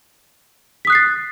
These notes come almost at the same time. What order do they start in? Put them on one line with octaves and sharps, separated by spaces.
B6 D#6 F#6 C7 A6